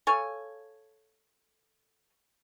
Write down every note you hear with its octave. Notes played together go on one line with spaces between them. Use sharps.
A4 C#5 F5 G#5